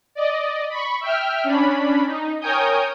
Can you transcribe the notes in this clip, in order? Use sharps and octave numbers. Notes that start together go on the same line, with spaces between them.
D5 D#5
B5 C#6
E5 G5 F6
C#4 D4 B5
D#4
A#4 C#5 G5 G#5 D#6 G6